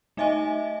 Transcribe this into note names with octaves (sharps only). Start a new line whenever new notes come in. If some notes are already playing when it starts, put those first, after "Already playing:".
A3 D#4 D#5 E5 G#5